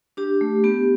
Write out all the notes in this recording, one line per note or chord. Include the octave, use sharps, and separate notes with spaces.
D4 G4
A3
B3 G4